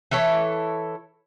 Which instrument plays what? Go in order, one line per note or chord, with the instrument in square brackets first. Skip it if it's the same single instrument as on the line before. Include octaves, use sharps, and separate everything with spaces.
[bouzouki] E3 E4 A4 C#5